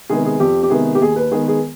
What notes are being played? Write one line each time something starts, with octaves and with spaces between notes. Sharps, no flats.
C3 D#3 G#3 B3 G#4
G#4
F2 G4
G4
C3 D#3 G#3 B3 G#4
G4
D#2 G#4
B4
D#3 G#3 B3 G#4
G#4